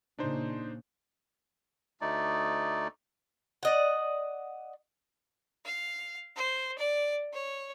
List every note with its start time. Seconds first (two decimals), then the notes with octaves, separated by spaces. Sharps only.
0.19 A#2 C#3 D4 D#4 C5
2.01 D2 A3 D#4 D5
3.63 D5 D#5 F#5
5.65 F5
6.36 C5
6.78 D5
7.33 C#5